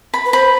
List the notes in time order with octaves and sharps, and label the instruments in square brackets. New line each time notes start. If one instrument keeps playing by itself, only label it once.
[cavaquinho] B5
[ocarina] B4
[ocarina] C5 [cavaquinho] B5